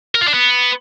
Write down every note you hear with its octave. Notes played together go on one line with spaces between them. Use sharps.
A#4
F4
D4
B3